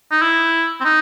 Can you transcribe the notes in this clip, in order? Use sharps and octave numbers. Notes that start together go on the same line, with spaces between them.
D#4
E4
C4
D#4